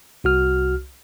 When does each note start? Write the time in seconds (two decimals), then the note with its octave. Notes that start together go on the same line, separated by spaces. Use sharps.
0.24 C2 F#4 F6